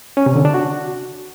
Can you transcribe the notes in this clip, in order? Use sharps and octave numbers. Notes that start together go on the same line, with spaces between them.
C#4
C3
D3
D4
F#4